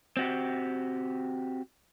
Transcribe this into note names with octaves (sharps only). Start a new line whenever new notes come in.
C4 F#4 G4